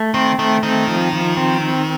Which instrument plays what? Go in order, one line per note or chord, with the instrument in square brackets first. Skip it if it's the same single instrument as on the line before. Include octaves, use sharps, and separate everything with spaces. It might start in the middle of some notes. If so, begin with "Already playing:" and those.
Already playing: [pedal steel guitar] A3
[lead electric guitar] D#3 [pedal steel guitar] C4
[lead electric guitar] D#3 [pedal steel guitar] A3
[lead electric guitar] D#3 [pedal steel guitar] C4
[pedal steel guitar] F3
F3
C4
C4